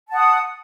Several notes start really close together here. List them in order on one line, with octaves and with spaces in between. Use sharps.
A5 F#5 D#6